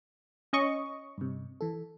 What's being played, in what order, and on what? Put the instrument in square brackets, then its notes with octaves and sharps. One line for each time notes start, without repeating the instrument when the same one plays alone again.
[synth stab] C#4 D#5 C#6
[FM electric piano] G2 C3
E3 A4